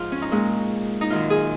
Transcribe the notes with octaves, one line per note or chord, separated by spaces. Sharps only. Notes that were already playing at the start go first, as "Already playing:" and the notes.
Already playing: G#2 F3 G#3 F4
C#4
D#4
A#2 G#3
D#4
F#2 D#3 F#3 F4
G#4